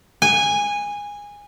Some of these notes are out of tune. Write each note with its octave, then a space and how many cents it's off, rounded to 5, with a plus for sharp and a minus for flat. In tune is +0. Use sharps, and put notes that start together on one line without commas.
G#5 -15